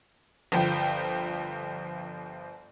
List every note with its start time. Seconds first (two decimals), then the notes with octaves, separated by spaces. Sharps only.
0.52 G1 F3 G5